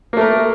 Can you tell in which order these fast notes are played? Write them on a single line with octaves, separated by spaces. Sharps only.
A#3 A3 A#4